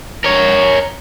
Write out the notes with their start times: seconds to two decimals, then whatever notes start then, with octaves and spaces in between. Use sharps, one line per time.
0.24 A#4 C#5